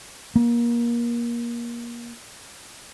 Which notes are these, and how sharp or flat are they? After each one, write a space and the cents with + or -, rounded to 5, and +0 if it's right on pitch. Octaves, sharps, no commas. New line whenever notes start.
A#3 +25